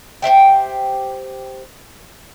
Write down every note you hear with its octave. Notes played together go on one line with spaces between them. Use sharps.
G4 C5 E5 G5